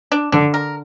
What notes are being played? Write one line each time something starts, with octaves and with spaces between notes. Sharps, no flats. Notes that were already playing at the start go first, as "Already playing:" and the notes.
D4
D3 D4
A#4